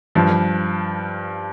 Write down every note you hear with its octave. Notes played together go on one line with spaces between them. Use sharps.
G2 F3